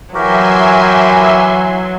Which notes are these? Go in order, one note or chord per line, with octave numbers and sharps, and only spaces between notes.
E3 F#3 F#4 G4 A#4 E5 G#5 C6